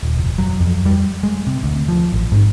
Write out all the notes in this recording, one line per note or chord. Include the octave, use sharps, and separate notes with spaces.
D#1
F1
F#3
F2
G3
G#3
C3
D2
F3
A1
G#2